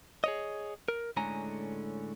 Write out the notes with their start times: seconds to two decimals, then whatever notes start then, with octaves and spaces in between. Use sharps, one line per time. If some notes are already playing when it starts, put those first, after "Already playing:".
0.24 G#4 C#5 D#5
0.88 A#4
1.17 A2 D3 G#3 C#4 G#5 A#5